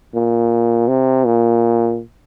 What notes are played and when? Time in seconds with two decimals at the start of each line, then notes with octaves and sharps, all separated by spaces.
0.15 A#2
0.88 C3
1.25 A#2